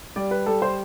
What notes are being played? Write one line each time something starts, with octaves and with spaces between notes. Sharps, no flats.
G3 D5
B4
G3 A4
C5